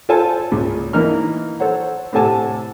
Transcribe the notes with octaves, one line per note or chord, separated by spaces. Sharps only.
F4 A4 C5 G#5 A5
C#2 A#2
E3 A#3 D#4 F6
A4 C5 C#5 F#5
A2 C3 A4 F#5 G#5 A5